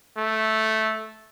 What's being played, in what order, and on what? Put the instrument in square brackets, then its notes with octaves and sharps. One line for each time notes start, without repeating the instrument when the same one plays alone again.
[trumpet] A3